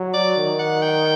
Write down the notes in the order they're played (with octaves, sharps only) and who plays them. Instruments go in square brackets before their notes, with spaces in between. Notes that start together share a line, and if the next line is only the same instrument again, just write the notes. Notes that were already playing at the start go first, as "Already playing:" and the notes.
Already playing: [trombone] F#3
[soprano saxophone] D5
[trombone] D#3
[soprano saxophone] F#5
G5